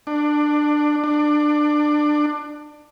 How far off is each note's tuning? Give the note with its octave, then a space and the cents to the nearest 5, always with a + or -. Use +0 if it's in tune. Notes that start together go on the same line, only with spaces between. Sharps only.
D4 +15
D4 +20